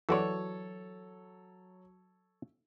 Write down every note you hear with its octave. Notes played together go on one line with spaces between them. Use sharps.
E3 F#3 F#4 A4 C#5 D5